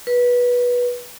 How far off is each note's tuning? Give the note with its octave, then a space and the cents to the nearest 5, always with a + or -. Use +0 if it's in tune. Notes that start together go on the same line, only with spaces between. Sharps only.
B4 -20